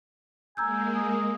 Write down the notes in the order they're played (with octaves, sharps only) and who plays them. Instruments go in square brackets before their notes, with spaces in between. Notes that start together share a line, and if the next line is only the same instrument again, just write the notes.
[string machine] G#3 A#3 [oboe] G#5 [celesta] A#5 E6 G6
[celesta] G#5 [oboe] D#6